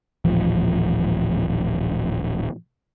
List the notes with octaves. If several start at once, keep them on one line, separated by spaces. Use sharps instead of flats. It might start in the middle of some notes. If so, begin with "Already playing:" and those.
D#1 A1 F3